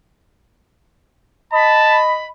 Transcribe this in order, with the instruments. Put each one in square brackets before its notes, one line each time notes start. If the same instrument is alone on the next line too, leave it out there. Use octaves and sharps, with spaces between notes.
[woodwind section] D#5 B5 [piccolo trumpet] A5